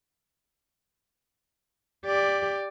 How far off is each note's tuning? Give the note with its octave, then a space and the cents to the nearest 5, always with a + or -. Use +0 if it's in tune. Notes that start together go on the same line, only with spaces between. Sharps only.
G4 +15 D5 +0